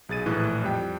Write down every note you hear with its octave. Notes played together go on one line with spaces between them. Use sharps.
B1 G#4 A6 D#7
A#1 A2 E3 E4 F#6
F2 G3 G5